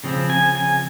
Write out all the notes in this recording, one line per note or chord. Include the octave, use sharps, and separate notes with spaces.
C#3 F3 C4
G#5
G#5